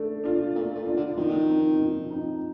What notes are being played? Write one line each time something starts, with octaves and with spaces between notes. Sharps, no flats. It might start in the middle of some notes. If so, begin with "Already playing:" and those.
Already playing: A3 D4
D4 F4
A#2 A3
A#2
D4 F4
D3
D#3 F3
C4 D#4
F3
C4 D#4